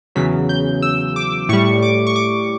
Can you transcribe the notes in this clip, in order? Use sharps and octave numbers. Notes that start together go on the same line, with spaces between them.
E2 C#3 F#3 B6
G6
E6
D6
A2 G3 C#6
D6
C#6
D6